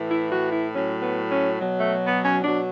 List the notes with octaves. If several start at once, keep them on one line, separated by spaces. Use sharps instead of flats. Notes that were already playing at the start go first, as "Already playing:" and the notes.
Already playing: A2 E3
E4
F#4
E4
A2 F#3 C#4
B3
C#4
B2 F#3
A3
B3
C#4
B2 F#3 D4